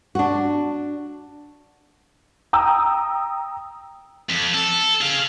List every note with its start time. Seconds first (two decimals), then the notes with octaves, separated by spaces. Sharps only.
0.15 D4 F#4
2.53 G5 A#5 D#6 E6
4.30 F2
4.55 A4
5.01 G#4 F5